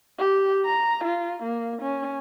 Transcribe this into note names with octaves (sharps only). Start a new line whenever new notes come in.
G4
A#5
F4
A#3
C#4